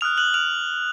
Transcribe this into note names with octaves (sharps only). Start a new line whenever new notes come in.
D#6 F6 F#6 F7
F#6 F#7
F6 F7